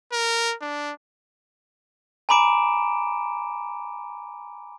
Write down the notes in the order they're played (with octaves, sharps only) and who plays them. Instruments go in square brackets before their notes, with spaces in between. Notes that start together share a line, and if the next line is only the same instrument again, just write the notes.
[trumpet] A#4
D4
[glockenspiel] G#5 A#5 B5 D6 D7 E7